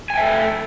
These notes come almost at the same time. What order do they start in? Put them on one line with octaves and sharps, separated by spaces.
G#5 G5 E5 A4